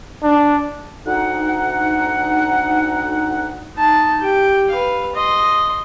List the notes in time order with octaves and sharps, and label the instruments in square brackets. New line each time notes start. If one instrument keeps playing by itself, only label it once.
[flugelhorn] D4
[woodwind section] D2 D#4 F#5
[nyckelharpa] D#4 A5
G4 G5
B4 F5
D#5 C6